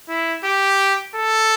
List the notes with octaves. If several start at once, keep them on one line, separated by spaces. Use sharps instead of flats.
E4
G4
A4